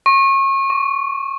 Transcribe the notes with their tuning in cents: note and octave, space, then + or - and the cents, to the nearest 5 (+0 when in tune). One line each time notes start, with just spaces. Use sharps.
C#6 -30
C#6 +25